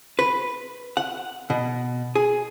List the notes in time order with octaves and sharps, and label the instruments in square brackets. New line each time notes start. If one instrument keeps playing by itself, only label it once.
[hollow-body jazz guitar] B4
F#5
B2
G#4